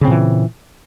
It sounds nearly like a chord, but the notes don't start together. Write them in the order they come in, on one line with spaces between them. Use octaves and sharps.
C#3 C4 A#2 E3